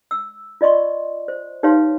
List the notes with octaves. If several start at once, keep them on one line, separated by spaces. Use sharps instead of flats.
E6
F4 D5 D#5 C6 C#6
C5
D#4 G4 B4 C#5 F5 C6